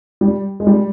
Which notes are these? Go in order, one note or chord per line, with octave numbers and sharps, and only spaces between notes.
G3
G#3
G3